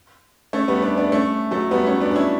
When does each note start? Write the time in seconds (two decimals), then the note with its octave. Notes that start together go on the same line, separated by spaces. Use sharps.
0.53 A3 C#4
0.68 G3 B3
0.82 B3 D4
0.97 B3 D4
1.12 A3 C#4
1.51 F#3 A3
1.71 G3 B3
1.86 A3 C#4
2.00 B3 D4
2.11 D4
2.15 C#4 E4